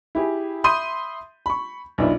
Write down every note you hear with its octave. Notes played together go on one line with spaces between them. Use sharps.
E4 G4 G#4
E5 B5 C6 D#6 G6 D#7
B5 C#6
B1 A#2 D4 E4